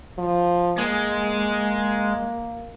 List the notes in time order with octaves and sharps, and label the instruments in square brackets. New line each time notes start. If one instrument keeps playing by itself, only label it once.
[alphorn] F3
[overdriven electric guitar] G#3 [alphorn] A#3